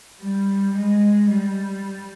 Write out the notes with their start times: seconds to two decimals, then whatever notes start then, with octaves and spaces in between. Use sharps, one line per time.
0.21 G3
0.76 G#3
1.30 G3